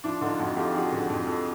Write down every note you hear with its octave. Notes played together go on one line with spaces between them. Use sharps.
F3 D4 E4
D3 D#4 F4
F2 E4 F#4
F2 F4 G4
F3 F#4 G#4
D3
F2
F2